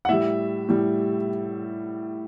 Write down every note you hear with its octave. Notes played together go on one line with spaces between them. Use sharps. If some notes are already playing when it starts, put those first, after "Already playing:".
F#5
A2 G3 E5
A2 G3